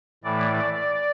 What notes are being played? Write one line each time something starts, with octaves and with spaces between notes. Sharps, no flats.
A2 E3 A3 D5
D5